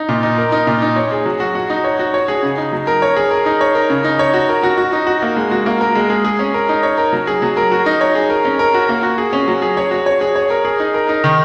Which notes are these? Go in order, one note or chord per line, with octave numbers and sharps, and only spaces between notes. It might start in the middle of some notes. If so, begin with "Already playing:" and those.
Already playing: D#4
A#2
D#4
A#4
D#4
A#2
D#4
C#5
G#4
F#3
F#4
F#4
D#4
C#5
F#4
C#5
G#4
C#3
D#4
F#3
A#4
C#5
G#4
A#4
D#4
C#5
A#4
C#3
D#4
C#5
F#4
A#4
F#4
F#4
D#4
F#4
A#3
G#3
F#4
A#3
A#4
G#3
G#4
G#4
C#4
A#4
D#4
C#5
A#4
F#3
G#4
F#3
A#4
F#4
D#4
C#5
G#4
A#4
C#4
A#4
F#4
A#3
F#4
G#4
C#4
F#3
G#4
C#5
F#4
C#5
G#4
C#5
A#4
G#4
D#4
A#4
D#4
D#3